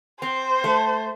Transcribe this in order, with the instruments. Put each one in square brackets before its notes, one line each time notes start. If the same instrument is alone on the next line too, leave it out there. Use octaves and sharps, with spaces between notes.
[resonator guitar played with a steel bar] C4 [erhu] C5
[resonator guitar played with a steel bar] A3